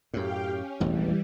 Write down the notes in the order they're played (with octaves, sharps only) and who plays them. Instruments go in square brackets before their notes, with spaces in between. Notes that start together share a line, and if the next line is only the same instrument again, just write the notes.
[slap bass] F#2 A2 [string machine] G4 F5 G5
[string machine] C#4
[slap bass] E1 A1 F2 [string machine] E3 G3